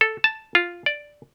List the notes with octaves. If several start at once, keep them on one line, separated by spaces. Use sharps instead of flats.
A4
A5
F4
D5